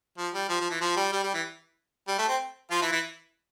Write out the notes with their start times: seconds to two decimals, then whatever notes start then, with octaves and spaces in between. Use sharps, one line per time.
0.18 F3
0.34 G3
0.49 F3
0.60 F3
0.70 E3
0.81 F3
0.97 G3
1.13 G3
1.23 G3
1.34 E3
2.08 G3
2.18 A3
2.28 C4
2.71 F3 F4
2.81 E3 E4
2.92 E3 E4